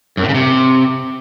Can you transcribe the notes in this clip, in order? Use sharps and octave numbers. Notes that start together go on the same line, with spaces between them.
F#2
A2
C#3
C3